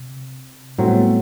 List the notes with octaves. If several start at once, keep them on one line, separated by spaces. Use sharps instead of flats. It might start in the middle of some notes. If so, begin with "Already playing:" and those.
Already playing: C3
A2 F#3 G3 C4
B3
A3